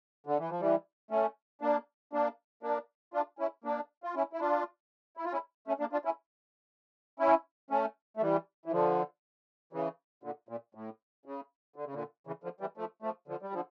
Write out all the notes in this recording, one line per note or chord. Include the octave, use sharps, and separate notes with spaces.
D3
E3
F3
E3 G3
A3 C#4
A#3 D4
A#3 D4
A#3 D4
D4 F4
C#4 E4
A#3 D4
F4
C#4 E4
E4
D4 F4
E4
F4
C#4 E4
A3 C#4
A#3 D4
D4 F4
C#4 E4
C#4 E4
A3 C#4
A3
E3 G3
E3
D3 F3
C#3 E3
A#2 D3
A#2
A2
C#3
D3
C#3
A#2 D3
C#3 E3
D3 F3
E3 G3
F3 A3
F3 A3
D3 F3
G3
D3 F3